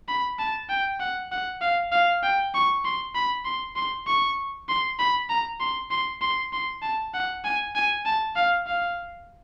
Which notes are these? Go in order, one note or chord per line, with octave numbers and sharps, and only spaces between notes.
B5
A5
G5
F#5
F#5
F5
F5
G5
C#6
C6
B5
C6
C6
C#6
C6
B5
A#5
C6
C6
C6
C6
A5
F#5
G#5
G#5
A5
F5
F5